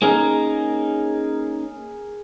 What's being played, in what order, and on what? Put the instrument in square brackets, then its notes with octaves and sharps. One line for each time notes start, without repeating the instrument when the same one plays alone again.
[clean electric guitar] A#3 C#4 D#4 [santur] G#4 A#4